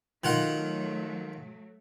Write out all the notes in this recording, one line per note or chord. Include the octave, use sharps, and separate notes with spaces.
D#3 F#3 A3 F4 F#5